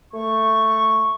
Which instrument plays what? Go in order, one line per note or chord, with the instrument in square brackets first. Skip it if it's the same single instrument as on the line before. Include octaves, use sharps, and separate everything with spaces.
[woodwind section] A3 C#6